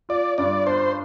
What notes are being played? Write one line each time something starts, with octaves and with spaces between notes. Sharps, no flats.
F4 D5
G2 D5
D4 C5